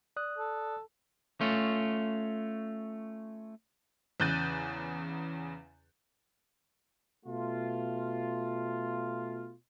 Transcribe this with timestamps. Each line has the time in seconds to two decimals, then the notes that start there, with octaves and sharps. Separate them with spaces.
0.16 D5 D#6 F#6
0.38 A4
1.41 A3 C#4 F4
4.20 E2 C#3 F#6 G6 A6 D#7
7.26 B2 A3 F4